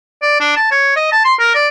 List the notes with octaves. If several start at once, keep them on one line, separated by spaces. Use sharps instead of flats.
D5
D4
A5
C#5
D#5
A5
C6
A#4
D5